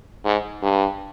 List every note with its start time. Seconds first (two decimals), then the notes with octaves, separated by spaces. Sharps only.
0.25 G#2
0.63 G2